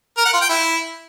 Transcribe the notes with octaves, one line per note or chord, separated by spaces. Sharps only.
A#4
F#5
F4
G5
E4